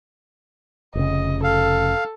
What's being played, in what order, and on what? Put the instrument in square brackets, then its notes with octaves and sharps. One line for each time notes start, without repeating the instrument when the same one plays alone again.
[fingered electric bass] F1 C#3 [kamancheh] D#5
[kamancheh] A4 [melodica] F5